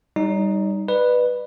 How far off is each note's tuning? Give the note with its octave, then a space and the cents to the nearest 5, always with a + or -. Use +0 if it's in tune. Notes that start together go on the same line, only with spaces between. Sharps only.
G3 +0 D#4 +0 D5 -45
B4 +0 D5 +40